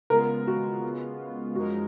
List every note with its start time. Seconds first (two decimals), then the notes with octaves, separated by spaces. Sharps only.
0.10 C#3 G#3 B3 F4 A#4
0.47 F#4
1.55 F#2 F3 G#3 D#4 F#4 A#4